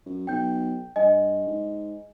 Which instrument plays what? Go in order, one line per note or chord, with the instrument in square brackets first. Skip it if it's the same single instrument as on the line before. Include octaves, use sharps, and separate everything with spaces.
[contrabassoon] F#2
[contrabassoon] B1 [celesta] G5 G6
[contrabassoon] G2 [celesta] D#5 G#5
[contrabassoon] G#2